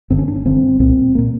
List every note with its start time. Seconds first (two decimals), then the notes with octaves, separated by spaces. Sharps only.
0.10 G1 G2 D3 C4
0.19 C#4
0.28 D4
0.36 C#4
0.45 G1 G2 D3 C4
0.80 C2 A#2 C4
1.15 A#2 A#3